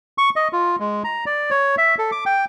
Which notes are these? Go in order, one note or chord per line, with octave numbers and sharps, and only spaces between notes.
C#6
D#5
F4
G#3
A#5
D5
C#5
E5
A4
D6
G5